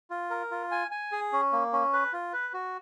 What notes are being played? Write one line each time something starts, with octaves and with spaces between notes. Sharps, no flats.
F4
A#4
F4
G#5
G#5
G#4
C#4
A#3
C#4
B4
F4
B4
F#4